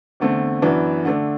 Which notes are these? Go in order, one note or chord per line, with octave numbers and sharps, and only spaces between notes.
E2 D3 A3 C4
F#2 E3 B3 D4
D3 A3 D4